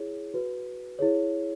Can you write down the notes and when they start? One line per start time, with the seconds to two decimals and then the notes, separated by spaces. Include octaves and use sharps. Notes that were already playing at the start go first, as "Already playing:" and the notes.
Already playing: E4 G#4 C#5
0.34 F#4 B4
0.99 E4 G#4 C#5